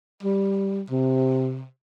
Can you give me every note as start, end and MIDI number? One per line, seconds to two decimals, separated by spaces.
0.23 0.81 55
0.90 1.65 48